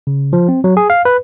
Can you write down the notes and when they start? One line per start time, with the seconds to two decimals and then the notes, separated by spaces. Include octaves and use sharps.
0.07 C#3
0.33 F3
0.48 C4
0.64 F#3
0.77 G#4
0.90 F5
1.05 B4